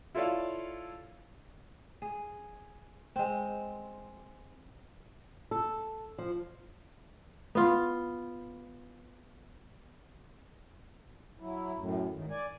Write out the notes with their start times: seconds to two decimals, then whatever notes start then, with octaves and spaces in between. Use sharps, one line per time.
0.15 E4 F4 A4 C#5 D5 F5
2.02 G#4
3.16 G#3 C4
5.51 A4
6.18 F3
7.55 B3 F4
11.40 F#3 E4
11.76 F#2 A2
12.11 G#2 D#3
12.30 D5 G#5